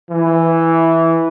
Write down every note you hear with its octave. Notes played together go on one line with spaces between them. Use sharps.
E3